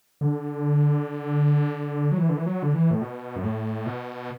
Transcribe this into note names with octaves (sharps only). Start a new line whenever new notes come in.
D3
F#3
E3
D3
E3
F#3
D3
E3
A2
B2
F#2
A2
B2